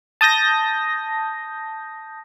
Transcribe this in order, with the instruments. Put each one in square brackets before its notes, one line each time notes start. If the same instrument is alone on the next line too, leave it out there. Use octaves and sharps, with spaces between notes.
[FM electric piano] A5 D#6 G6 A#6